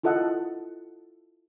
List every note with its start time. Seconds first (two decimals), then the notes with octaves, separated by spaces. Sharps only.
0.03 E4 F4 A4 D#5 F#5